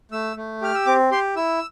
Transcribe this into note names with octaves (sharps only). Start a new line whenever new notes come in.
A3 E6
A3
G4 F6
E6
C4 D6
G4 C6
E4 E6